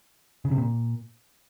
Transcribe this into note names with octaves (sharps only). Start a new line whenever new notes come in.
C#3
C3
A#2